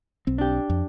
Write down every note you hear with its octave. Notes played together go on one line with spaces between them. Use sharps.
B1 C4
D4 G4
F2